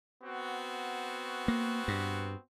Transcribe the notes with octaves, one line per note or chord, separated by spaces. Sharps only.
B3 C4 F#4
A#3
G2